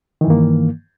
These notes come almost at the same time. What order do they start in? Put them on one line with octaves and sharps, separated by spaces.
D#3 E3 G2 A#3